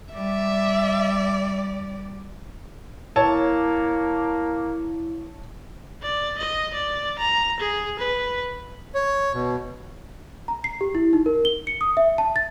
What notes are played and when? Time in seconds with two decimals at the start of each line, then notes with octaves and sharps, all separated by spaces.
0.14 G3 D5 E5
3.16 A#3 E4 C#5 A5
6.02 D5
6.38 D#5
6.74 D5
7.19 A#5
7.60 G#4
8.00 B4
8.94 C#5
9.34 B2
10.48 A#5
10.64 C7
10.81 G4
10.95 E4
11.13 D#4
11.26 A#4
11.45 G7
11.67 C#7
11.81 D#6
11.97 E5
12.18 A5
12.36 A6